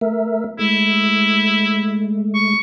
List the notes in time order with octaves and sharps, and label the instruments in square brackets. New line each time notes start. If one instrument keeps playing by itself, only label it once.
[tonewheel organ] A3 A#4 E5
[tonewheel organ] G#3 A3 [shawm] E4
[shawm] C#6